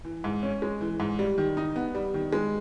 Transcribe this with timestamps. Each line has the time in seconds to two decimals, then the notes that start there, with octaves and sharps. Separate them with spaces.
0.05 E3
0.24 G#2
0.43 C#4
0.62 G#3
0.81 E3
1.00 G#2
1.19 G3
1.38 D#3
1.57 D#4
1.76 B3
1.95 G3
2.14 D#3
2.33 G#3